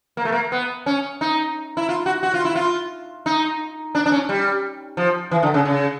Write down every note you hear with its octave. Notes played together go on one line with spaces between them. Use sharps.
A#3
A3
A#3
B3
C#4
D#4
E4
F4
F#4
F#4
F4
E4
F4
D#4
D4
D4
C#4
G3
F3
E3
D3
C#3
C#3